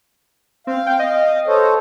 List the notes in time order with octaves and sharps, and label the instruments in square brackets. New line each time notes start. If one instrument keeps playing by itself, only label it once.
[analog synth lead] C4 [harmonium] F5
[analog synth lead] G5
D#5
[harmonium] A4 C5 C#5